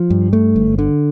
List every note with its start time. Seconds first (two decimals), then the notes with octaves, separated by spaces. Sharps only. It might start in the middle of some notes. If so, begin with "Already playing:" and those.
Already playing: F3
0.10 G2
0.33 A3
0.56 G1
0.79 D3